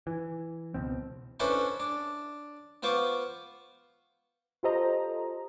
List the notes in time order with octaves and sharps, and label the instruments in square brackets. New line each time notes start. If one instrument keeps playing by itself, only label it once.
[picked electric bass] E3
C#2 B2 C4
[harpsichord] C#4 D4 E4 A4 B4 C5
D4
B3 F4 C5 C#6 D6
[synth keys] F4 G4 A4 C5 D#5 A#5